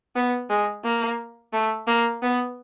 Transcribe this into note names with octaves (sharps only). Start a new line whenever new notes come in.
B3
G#3
A#3
A3
A#3
B3